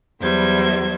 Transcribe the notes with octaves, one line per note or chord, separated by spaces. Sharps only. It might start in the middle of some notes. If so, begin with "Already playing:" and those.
E2 F#3 G3 C5 G#6